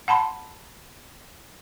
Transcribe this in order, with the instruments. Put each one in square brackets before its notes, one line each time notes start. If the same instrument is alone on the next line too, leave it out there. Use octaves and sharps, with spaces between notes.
[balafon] F#5 A5 B5 C6